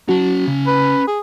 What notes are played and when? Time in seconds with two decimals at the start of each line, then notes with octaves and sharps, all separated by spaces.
0.09 F#3 C#4 F#4 A5
0.47 C#3
0.67 B4
1.07 G#4